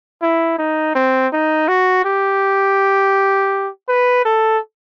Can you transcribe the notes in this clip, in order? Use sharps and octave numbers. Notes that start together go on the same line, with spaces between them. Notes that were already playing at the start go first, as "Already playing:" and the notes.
E4
D#4
C4
D#4
F#4
G4
B4
A4